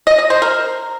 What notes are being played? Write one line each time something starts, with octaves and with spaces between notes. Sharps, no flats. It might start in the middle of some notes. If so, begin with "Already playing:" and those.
D#5
D#5
C5
A#4